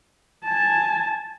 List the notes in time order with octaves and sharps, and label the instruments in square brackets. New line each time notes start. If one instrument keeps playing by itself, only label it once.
[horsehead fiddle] G#5 A5